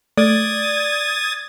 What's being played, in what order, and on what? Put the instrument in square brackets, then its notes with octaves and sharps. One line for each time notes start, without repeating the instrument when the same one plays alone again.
[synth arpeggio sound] A3 [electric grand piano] D5 [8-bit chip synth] D#6 G#6 A6